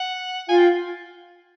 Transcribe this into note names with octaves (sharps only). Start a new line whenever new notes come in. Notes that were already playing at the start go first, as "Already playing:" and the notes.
Already playing: F#5
F4 F5 G#5
G5